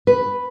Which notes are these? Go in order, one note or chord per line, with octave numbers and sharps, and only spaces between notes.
B4